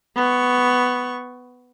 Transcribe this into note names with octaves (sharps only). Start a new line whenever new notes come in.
B3 C#6